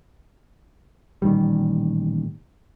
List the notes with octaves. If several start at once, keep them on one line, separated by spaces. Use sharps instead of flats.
A1 A#2 D#3 G3